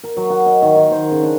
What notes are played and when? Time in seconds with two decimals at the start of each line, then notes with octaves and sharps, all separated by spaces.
0.04 A#4
0.17 F#3
0.30 F#5
0.46 D#5
0.62 D#3
0.76 D#3
0.91 C5
1.12 C#3
1.23 D4